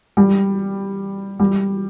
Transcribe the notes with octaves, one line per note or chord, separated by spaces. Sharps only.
G3
G3